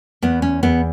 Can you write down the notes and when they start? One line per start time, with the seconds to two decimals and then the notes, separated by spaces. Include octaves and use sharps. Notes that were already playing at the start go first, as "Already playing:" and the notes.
0.22 E2 B3
0.42 C#4
0.63 E2 B3